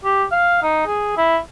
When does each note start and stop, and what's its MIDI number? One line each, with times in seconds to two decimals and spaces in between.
0.04 0.24 67
0.32 0.60 77
0.63 0.86 63
0.87 1.16 68
1.17 1.38 64